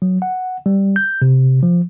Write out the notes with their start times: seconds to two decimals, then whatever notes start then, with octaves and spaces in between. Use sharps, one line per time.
0.02 F#3
0.22 F#5
0.66 G3
0.96 G6
1.22 C3
1.63 F3